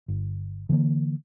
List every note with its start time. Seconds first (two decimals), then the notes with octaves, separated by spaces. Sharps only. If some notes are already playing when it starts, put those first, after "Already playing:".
0.08 G1
0.69 D3 E3 G3 A#3